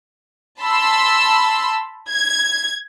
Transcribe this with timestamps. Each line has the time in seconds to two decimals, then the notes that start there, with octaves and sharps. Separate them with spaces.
0.61 A5 B5 C6 E6
2.10 G#6